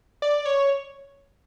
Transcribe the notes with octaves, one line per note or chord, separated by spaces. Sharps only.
D5
C#5